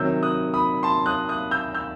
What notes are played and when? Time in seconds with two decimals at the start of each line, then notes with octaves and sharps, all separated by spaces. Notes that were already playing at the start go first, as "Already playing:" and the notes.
Already playing: C3 D#3 F#3 E6 G6
0.23 D#6 F#6
0.54 B5 D#6
0.83 A5 C6
1.06 D#6 F#6
1.29 D#6 F#6
1.51 E6 G6
1.74 E6 G6